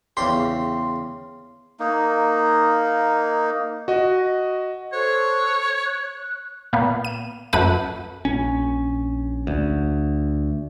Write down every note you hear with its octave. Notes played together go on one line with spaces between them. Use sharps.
E2 C#3 G4 C6
A#3 D#4
F#4 D#5
A4 C5 C#5 F#6
F#6
A#2 B3
D#7
F#2 A3 B4 D#7
A#1 C#4
D2